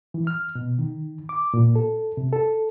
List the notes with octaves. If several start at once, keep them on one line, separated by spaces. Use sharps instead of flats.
E3
F6
B2
D#3
D6
A#2
A4
C3
A4